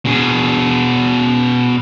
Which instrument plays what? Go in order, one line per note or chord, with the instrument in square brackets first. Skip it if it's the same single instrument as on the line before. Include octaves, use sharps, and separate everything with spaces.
[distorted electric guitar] B2 G#4